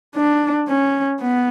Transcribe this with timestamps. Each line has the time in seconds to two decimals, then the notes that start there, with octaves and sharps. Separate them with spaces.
0.15 D4
0.68 C#4
1.20 B3